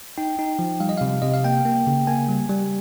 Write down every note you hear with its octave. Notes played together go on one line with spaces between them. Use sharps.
D#4 G5
D#4
F3
G3 F5
D#5
C3 F5
C3 D#5
F5
A#3 G5
A#3
C#3
A#3 G#5
G3
G3